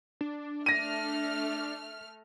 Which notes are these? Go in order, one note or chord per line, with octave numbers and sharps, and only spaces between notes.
D4
A3 F6 A#6 D#7